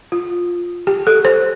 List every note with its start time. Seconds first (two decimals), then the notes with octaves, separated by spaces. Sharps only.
0.12 F4
0.87 G4
1.07 A4
1.25 C5